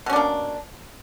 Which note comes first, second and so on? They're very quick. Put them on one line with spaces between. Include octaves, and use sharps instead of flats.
B2 C#4 D4 A#3